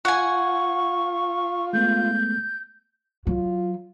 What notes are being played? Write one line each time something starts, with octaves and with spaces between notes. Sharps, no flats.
F4 F#5 G#5 C#6
G#3 A3 B3 G6
F#3 F4